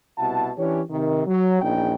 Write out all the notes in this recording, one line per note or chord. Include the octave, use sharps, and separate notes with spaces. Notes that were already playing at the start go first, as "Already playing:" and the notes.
C2 B2 E4 F#5 A5
E3 C#4 D4 G4 C#5
C3 D#3
F#3
A#1 E2 A#2 C#4 D#4 G5